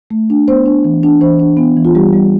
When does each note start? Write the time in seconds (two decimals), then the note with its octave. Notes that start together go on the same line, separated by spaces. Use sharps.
0.10 A3
0.30 D4
0.48 B3 C5
0.66 D4
0.85 E3
1.03 D4
1.21 E3 C5
1.40 D4
1.57 B3
1.77 E3
1.85 F4
1.95 G3 G4
2.13 G3